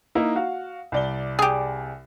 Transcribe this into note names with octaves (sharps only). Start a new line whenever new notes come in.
A#3 D#4 E4
F#4 F5
C2 D5 G7
G4 G#4